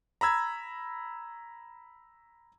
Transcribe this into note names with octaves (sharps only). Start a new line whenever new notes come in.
A#5 B5 E6 G#6